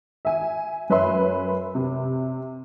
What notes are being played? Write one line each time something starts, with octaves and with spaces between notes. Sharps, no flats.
E5 G#5
F#2 B4 C#5 E5 C6
C3